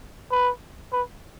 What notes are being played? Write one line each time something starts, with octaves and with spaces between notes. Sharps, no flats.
B4
B4